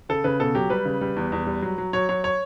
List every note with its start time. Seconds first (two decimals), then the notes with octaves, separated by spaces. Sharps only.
0.09 C#3 A4
0.24 C#3 B4
0.40 B2 A4
0.55 F#3 G4
0.70 G3 B4
0.85 C#3
1.01 G3
1.16 E2
1.32 E2
1.47 G3
1.63 F#3
1.78 F#3
1.93 F#3 C#5
2.09 F#3 C#5
2.24 C#5